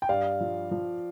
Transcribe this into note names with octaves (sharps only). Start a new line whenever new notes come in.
G5
G2 D5 F5
F3
F3